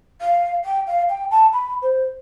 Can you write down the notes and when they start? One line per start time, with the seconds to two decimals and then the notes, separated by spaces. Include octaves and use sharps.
0.21 F5
0.65 G5
0.87 F5
1.09 G5
1.31 A5
1.53 B5
1.82 C5